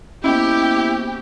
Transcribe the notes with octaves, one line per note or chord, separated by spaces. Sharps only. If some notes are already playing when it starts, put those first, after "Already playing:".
A#3 B3 C#4 E4 G4 C5 D#5 G5